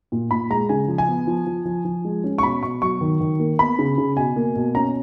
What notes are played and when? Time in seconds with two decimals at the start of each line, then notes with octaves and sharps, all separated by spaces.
0.12 A#2
0.31 A#2 B5
0.50 G#3 A#5
0.69 C#3 G#5
0.88 F3
0.98 G#5
1.08 B3
1.27 F3
1.46 F3
1.65 F3
1.85 F3
2.05 G#3
2.24 C#4
2.38 C#6
2.43 B2 B5
2.63 B2 C#6
2.82 F#3 C#6
3.01 D#3
3.20 D#3
3.40 A#3
3.59 B3 B5
3.79 C#3
3.98 C#3
4.17 B2 G#5
4.36 A#3
4.56 B2
4.75 C#4 A#5